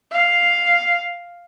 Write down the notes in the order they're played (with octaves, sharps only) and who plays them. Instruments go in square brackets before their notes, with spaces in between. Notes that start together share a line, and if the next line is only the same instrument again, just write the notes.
[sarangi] F5